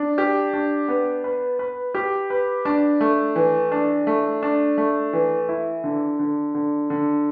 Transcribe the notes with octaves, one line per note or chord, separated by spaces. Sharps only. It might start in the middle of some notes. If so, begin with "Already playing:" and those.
Already playing: D4
G4
D4
B3
B4
B4
G4
B4
D4
A3
E3
D4
A3
D4
A3
E3
E4
D3
D3
D3
D3